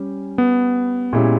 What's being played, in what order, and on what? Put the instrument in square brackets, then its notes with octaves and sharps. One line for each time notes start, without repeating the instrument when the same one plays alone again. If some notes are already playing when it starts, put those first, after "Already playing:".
Already playing: [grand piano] G3 C#4 G4
[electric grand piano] B3
[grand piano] A#2 G#3 C#4 E4 G4